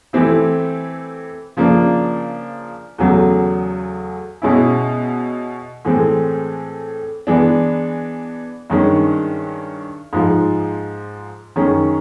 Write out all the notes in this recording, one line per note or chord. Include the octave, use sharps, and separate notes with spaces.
E3 A3 C4 E4 G4
C#3 F3 A#3 D4
E2 C#3 F#3 A3
B2 G#3 C#4 E4
A2 E3 G#3 C4
E3 G#3 B3 D4
G2 D#3 G#3 C#4
G#2 F3 G#3
F#2 D#3 G#3 C#4